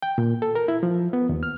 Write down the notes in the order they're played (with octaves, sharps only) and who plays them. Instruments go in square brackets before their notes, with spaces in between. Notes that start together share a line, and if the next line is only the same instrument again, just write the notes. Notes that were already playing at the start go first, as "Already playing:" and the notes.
[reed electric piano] G5
A#2
A4
A#4
E4
F3
B3
D#2
F6